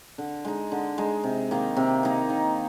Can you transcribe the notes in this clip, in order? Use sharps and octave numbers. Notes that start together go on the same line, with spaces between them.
D3
G#3 D#4
D3
G#3 D#4
C3
D#3 A#3 D#4
C3
D#3 A#3 D#4
D#3